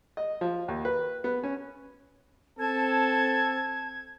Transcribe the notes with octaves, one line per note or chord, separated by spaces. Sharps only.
D#5
F3
D#2
B4
B3
C#4
C4 A4 A5 G#6